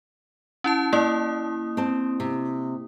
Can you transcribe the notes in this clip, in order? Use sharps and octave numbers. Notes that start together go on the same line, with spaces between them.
C#4 E4 A5
A#3 E4 D5 D#6
C4 A5
C3